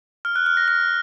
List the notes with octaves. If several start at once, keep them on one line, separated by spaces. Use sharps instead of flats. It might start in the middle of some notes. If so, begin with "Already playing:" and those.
F6
F#6
F6
A#6
F6